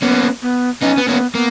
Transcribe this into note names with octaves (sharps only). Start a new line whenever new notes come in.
A#3 B3 C#4
B3
B3 C#4 D#4
B3
A#3 B3 C#4
A#3 B3